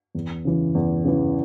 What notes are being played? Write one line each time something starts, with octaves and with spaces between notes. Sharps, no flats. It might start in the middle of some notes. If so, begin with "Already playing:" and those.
E2
C#3 E3
E2
C#3 E3